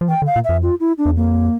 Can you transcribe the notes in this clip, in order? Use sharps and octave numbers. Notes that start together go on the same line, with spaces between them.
F3
E3 G5
D3
F5
A#2
F2 E5
F4
E4
D4
E2
F2 A#3